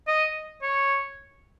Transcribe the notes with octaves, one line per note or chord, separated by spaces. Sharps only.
D#5
C#5